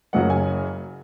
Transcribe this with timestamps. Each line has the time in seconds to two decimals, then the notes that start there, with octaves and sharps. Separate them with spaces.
0.13 F#1 F#2 C#3 F#3 F#5
0.30 G#5